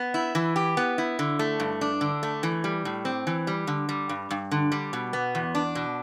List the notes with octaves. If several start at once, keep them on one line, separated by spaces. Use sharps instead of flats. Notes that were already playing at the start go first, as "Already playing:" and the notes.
Already playing: B3
E4
E3
G4
B3
E4
D3
A3
G2
D4
D3
A3
E3
G3
A2
C4
E3
G3
D3
G3
G2
G2
D3
G3
B2
B3
E2
D4
B2